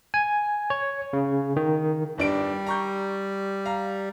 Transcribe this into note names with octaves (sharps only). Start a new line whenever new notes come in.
G#5
C#5
C#3
D#3
G1 G3 D4 D7
A#5 C#6 G6
F5 A#5